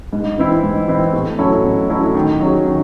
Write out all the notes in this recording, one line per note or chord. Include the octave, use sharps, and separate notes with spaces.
G#2
E3 C4 E4
G#2
E3 C4 E4
A2
F#3 C#4 E4 A4
A2
F#3 C#4 E4 A4
D#3
F#3 C#4 G#4
D#3